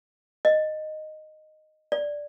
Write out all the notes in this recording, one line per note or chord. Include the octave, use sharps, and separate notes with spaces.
D#5
D5